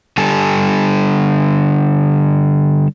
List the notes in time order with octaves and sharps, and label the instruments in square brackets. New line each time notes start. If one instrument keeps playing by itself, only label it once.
[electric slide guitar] D3 G3 G4 A4 G#5 A5